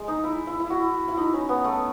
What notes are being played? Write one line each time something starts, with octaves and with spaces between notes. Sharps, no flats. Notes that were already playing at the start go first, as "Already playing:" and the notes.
Already playing: G#3
D#4
E4
E4
E4
F#4
E4
D#4
C#4
B3
A3